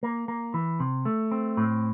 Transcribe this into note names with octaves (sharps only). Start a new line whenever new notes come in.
A#3
A#3
E3
C3
A3
C4
A2